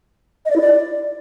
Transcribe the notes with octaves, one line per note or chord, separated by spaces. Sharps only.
D#5
D5
E4
D5